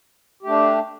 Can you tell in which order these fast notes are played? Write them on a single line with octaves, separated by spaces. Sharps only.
G4 A3 D4